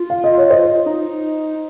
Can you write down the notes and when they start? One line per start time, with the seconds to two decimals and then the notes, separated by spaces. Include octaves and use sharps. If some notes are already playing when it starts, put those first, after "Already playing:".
Already playing: F4
0.10 F5
0.24 D#5
0.38 C#5
0.50 C5 D#5
0.86 D#4